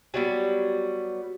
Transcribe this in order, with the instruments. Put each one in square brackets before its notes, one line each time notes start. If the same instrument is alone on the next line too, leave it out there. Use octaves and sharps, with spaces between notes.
[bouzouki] F#3 G3 B3